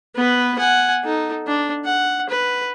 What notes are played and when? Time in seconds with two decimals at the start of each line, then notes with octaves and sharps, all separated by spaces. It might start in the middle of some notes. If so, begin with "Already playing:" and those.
0.15 B3 B4
0.59 F#5 G#5
1.04 D#4 A4
1.47 D4
1.85 F#5
2.29 B4